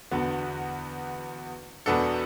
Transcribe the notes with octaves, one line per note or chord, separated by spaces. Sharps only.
E2 D3 B3 F#4
E2 B2 B3 D4 A4